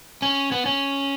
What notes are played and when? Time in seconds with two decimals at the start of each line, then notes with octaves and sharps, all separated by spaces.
0.22 C#4
0.52 B3
0.66 C#4